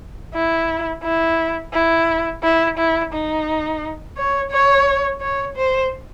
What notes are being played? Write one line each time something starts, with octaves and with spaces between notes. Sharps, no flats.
E4
E4
E4
E4
E4
D#4
C#5
C#5
C#5
C5